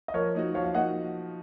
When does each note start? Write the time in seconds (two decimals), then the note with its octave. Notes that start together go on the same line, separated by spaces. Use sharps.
0.08 D#5
0.14 F3 A#4 C#5
0.35 A#3 D#4 F#4
0.54 F3 C#5 F5
0.64 F5
0.74 A#3 D#4 F#4 D#5 F#5